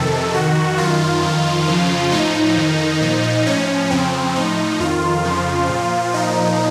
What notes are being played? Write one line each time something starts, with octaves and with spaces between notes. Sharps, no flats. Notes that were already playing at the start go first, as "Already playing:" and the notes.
Already playing: F2 C3 D#3 A4
F2 D#3 F#4
F#2 D#3 F4
F2 D#3
F2 C#3 F3
A2 F3 D#4
F2 D#3
A#2 F3
A2 F3 C#4
F2 C#3 F3 C4
A2 F3 D#4
F2 D#3 F4
F2 C#3 F3
A#2
F3
A#2 F3 D#4